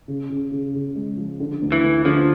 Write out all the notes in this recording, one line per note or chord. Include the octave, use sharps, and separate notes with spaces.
C#3
C#3
C#3
C#3
G#3
F3
D3
D2
E3
D2
D3 F3